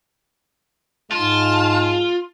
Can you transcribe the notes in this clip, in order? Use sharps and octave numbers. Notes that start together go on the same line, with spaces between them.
G#2 G#3 F4 A5